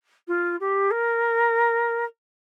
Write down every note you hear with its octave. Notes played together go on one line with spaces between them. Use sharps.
F4
G4
A#4